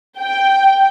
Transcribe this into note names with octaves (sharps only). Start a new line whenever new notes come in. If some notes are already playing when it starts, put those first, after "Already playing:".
G5